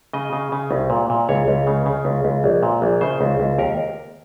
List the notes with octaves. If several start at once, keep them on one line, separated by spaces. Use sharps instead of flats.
C#3 D#5
C#3
C#3
C2
A#2
A#2
C#2 C#5
C#2
C#3
C#3
C#2
C#2
A#1
A#2
A#1
C#3 C5
C#2
C#2
D#2 A#4